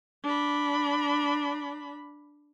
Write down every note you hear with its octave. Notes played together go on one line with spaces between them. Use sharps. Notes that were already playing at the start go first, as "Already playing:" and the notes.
D4 B5